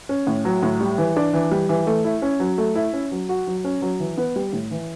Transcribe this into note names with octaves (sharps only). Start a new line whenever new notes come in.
C#4
A2
F#3
A2
G3
E3
D4
E3
G3
E3
A3
E4
C#4
F#3
A3
E4
C#4
F#3
F#4
F#3
C#4
F#3
E3
B3
G3
A2
E3